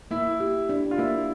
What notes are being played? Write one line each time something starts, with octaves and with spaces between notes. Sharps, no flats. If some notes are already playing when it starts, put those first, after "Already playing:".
A#3 E4
G4
D4
F4
A#3 E4